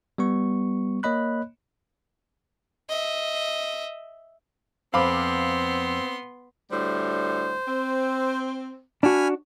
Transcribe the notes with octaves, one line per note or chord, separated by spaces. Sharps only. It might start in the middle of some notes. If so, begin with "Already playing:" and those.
G3 B3 C#6
A#3 C#5 D#5 B5 F#6
D#5 E5
F2 B3 C4 F5 B5 C6 D6
D2 A2 G3 C5
C4
D4 F#4 G#5 B5 F6